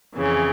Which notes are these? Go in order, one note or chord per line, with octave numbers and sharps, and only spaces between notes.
F2 C#3 E3